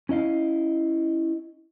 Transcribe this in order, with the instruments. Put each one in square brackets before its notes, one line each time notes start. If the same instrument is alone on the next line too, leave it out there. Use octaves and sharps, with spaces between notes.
[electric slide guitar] C#4 E4 D#5 F5